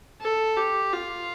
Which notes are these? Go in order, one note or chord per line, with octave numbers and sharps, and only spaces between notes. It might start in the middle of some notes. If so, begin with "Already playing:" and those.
A4
G4
F4